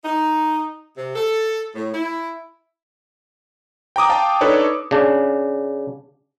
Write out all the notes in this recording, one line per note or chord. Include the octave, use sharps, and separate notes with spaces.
D#4
C3
A4
A2
E4
G5 A#5 D6 D#6
F5 G5 A5
D4 D#4 A4 B4 C#5
C#3 D4